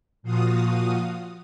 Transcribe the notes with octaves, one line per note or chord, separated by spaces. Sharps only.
A#2 F3 F4 F#4 F5 D#6